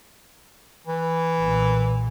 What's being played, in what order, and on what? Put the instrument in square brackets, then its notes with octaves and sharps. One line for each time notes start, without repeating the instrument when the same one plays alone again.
[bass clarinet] E3
[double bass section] B1 A#2